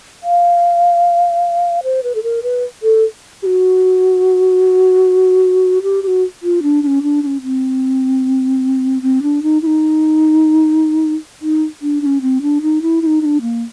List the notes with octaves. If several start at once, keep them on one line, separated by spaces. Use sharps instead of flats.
F5
C5
B4
A4
A#4
B4
A4
G4
F#4
G4
G4
F#4
F4
D4
D4
C#4
D4
D4
C#4
C4
C4
D4
D#4
E4
D#4
D#4
D4
D4
C#4
C4
D4
D#4
E4
E4
D#4
D#4
D4
A#3